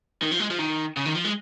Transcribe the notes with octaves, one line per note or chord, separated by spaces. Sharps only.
D#3
F3
G#3
F3
D#3
C#3
D#3
F3
G#3